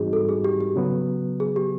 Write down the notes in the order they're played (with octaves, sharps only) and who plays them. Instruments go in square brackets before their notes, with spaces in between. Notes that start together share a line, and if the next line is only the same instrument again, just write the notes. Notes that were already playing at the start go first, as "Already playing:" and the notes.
Already playing: [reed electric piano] G#2 E3 G3 C4 D#4 [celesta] F#4 G#4
[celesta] A4
G#4
G4
G4
[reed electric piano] C#3 F#3 B3
[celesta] G#4
G4